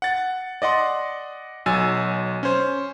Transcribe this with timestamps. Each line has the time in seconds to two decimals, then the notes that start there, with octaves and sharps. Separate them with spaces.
0.02 F#5 A6
0.62 D5 D#5 F#5 C6
1.66 B1 F#3 G#5 E6 A6
2.43 C#4 C5